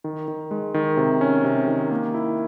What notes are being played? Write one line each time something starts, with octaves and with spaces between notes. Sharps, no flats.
D#3
D#3
G#3
D#3
C3
C#4
C3
D#3
A#3
E4